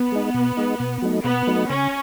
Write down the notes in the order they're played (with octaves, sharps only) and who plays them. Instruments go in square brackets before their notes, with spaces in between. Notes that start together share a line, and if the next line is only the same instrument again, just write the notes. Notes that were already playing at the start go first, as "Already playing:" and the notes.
Already playing: [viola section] B3
[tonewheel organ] G#3 D#4
B2
G#3 D#4
B2
F#3 A3 D#4
[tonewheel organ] B2 [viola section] B3
[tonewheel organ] F#3 A3 D#4
[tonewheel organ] C#3 [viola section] C#4